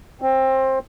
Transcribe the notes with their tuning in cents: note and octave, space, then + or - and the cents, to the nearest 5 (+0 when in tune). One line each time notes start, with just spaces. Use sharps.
C4 +20